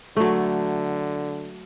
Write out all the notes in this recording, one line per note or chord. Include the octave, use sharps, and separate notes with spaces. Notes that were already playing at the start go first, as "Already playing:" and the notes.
D3 F#3 A3